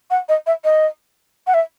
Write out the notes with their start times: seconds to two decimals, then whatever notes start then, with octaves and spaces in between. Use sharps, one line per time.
0.10 F#5
0.29 D#5
0.46 E5
0.64 D#5
1.47 F#5
1.54 E5